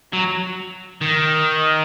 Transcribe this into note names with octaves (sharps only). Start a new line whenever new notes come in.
F#3
D#3